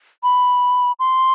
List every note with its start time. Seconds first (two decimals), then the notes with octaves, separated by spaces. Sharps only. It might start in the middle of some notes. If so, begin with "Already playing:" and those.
0.23 B5
0.99 C6